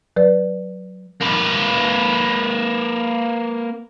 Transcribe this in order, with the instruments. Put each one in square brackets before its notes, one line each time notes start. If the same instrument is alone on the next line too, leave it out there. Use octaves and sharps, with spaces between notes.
[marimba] F#3 B4 D5
[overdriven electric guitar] A#3 B4